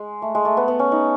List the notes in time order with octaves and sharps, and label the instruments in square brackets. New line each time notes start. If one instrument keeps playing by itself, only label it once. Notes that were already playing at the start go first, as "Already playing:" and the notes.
Already playing: [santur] G#3
A3
G#3
A3
B3
B3
C#4
D#4